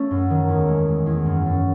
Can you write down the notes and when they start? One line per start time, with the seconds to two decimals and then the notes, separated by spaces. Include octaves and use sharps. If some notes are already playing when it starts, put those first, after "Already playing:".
Already playing: A3 C#4
0.11 F#2
0.30 D#3
0.48 E2
0.68 G#3
0.88 G#3
1.06 E2
1.25 F#2
1.46 F#2